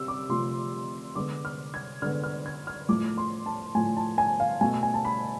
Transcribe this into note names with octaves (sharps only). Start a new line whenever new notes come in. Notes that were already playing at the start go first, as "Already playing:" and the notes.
Already playing: C3 E6
D6
C3 F3 A3 C6
D3 G#3 B3 D6
F6
G#6
D3 G#3 B3 F6
F6
G#6
F6
A2 F3 A3 D6
C6
A5
A2 F3 A3 G#5
A5
G#5
F5
B2 A3 G#5
G#5
A5
B5